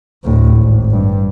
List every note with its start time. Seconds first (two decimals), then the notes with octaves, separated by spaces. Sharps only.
0.24 D2 A2
0.55 G#1
0.91 G2